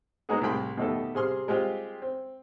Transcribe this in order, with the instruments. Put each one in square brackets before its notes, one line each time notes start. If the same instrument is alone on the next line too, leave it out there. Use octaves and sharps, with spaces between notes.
[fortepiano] G#3 A#3 B3 D#4 F#4 G#4
C2 A2 G#4 G5 B5 C6
B2 D#3 A3 G4 A4
C3 G#4 C6 F6
G3 G#3 C4 F4 G4
C4